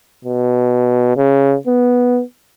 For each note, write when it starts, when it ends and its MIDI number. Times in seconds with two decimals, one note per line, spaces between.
0.24 1.15 47
1.17 1.55 49
1.67 2.22 59